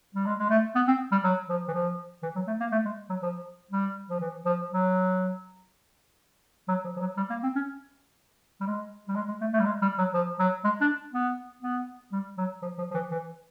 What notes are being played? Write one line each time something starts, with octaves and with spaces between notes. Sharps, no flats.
G3
G#3
G#3
A3
B3
C4
G3
F#3
F3
E3
F3
E3
F#3
A3
A#3
A3
G#3
F#3
F3
G3
F3
E3
F3
F#3
F#3
F3
F3
F#3
G3
A#3
C4
C#4
G3
G#3
G3
G#3
G#3
A3
A3
G3
G#3
G3
F#3
F3
F#3
G#3
D4
B3
B3
G3
F#3
F3
F3
F3
E3
E3